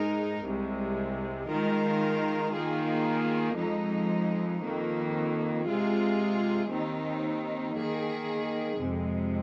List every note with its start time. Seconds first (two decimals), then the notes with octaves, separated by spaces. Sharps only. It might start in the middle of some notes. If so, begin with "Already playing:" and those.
Already playing: G#2 G#3 D#4 A#4
0.44 C2 C3 G#3
1.48 D#3 G#3 F4 A#4
2.53 D#3 A#3 F4 G#4
3.57 F2 F3 G#3 D#4
4.61 F2 D#3 A#3
5.65 C3 G#3 F4 G#4
6.70 D#2 D#3 C4 D#4
7.74 D#3 A#3 G#4
8.78 F2 C3 G#3